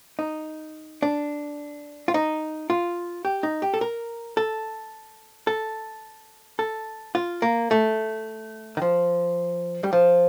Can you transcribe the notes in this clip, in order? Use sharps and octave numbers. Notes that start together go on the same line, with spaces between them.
D#4
D4
F4
D#4
F4
G4
D#4
G4
A4
A#4
A4
A4
A4
F4
A#3
A3
D#3
F3
G3
F3